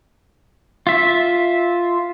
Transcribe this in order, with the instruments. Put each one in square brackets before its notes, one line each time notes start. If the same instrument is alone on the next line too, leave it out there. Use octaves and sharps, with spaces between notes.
[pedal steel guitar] F4 E5